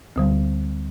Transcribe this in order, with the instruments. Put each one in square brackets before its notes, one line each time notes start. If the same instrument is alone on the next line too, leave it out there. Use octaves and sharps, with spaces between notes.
[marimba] D2 D3 G3